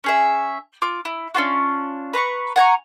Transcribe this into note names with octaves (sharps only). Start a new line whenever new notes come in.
C#4 G#4 E5
F4 D6
E4
C#4 D4 F4 F#4
B4 A#5 C6 C#6
F#5 G#5 A#5 C#6